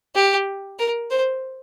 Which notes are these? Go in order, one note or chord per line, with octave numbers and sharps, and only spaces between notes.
G4
A#4
C5